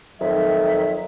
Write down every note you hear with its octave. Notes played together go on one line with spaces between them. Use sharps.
F2 D#3 F#3 E5